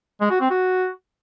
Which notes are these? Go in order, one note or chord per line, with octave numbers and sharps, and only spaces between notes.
G#3
F#4
C4
F#4